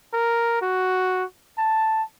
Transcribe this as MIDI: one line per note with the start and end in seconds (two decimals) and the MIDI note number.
0.14 0.58 70
0.62 1.24 66
1.58 2.03 81